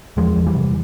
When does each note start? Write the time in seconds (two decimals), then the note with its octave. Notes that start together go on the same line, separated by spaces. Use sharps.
0.17 E2 F3 G#3
0.36 E2
0.46 E3 G3
0.55 C3